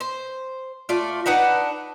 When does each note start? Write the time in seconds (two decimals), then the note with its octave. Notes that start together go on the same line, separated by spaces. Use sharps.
0.01 C5
0.89 A3 F4 D5
1.26 D4 D#4 B4 F#5